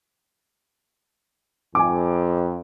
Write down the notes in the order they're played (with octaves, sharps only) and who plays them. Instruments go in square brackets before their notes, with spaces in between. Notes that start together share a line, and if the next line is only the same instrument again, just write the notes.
[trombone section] F2 [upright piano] G#5 D6